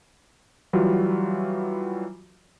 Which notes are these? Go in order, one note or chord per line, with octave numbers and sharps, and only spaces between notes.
E3 F#3 G3 F4 F#4